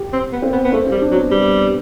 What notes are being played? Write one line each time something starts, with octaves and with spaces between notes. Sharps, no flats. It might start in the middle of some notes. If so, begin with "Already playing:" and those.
Already playing: G4
C4
B3
C4
B3
B3
A3 C4
G3 C4
D4
F#3
B3
G3 B3